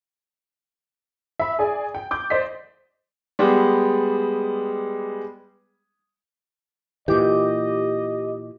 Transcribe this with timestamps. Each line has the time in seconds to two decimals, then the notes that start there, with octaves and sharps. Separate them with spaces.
1.40 E5 B5
1.59 G#4 D5 G#5
1.95 G5
2.11 D6 G6
2.30 C5 D5 D#5 B6
3.39 G3 G#3 B3 G#4
7.08 A#2 E3 G4 D#5 D6